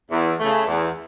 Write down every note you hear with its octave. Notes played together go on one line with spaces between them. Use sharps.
E2
C#3 A3
E2